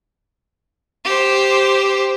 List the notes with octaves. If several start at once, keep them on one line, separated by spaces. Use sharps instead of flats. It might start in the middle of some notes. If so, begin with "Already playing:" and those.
G4 C5